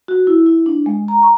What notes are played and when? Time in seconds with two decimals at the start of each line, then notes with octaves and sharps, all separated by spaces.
0.08 F#4
0.27 E4
0.46 E4
0.66 D4
0.86 G#3
1.08 A#5
1.23 C#6